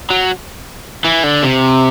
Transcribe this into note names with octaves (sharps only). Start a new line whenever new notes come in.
F#3
E3
D3
C3